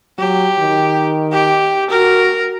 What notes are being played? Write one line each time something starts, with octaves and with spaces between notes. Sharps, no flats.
F#3 G4
D#3
G4
F#4 A#4